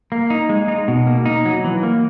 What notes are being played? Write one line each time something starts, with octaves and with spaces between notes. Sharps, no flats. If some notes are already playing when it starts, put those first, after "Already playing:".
A#3
D#4
G#3
D#4
B2
A#3
D#4
F#3
E3
A#3